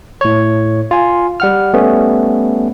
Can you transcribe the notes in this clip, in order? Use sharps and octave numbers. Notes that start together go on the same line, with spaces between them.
A2 C#5
F4 G#5
G3 F#5 F6
G3 A3 B3 C#4